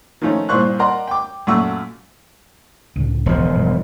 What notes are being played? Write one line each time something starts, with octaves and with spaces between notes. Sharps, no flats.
D#3 F3 A3 C#4 D#4
G2 A#2 E4 C5 C#6 F#6
A#4 D5 D#5 F#5 A#5 C6
G5 D6
F#2 A#2 A3 F#5 C#6 E6
C#2 A2 D3
E1 F3
G2 B2